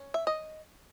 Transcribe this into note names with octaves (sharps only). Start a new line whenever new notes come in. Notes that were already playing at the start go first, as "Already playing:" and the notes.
Already playing: C#4
E5
D#5